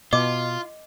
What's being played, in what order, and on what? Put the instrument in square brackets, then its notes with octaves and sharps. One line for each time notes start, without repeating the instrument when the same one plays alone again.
[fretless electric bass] B2 [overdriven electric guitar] F4 [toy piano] D#5 [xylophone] D6